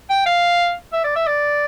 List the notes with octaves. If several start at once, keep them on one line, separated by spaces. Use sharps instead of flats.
G5
F5
E5
D5
E5
D5